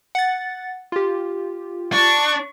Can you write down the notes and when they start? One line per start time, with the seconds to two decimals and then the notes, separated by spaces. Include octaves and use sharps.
0.15 F#5 A6
0.92 F4 G4
1.93 D4 C#6